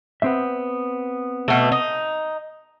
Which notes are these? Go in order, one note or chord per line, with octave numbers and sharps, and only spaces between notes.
B3 C4 E5
B2 A3
D#4